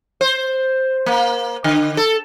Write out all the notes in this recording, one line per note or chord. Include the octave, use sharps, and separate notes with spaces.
C5
A#3
D3
A4